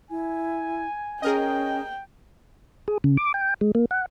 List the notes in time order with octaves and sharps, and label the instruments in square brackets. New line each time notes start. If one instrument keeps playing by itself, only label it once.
[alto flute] E4 [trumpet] G#5
[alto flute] C#4 [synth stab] G#4 A#4 D#5 [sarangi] G5
[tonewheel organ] G#4
C#3
D6
G5
G#3
A#3
F#5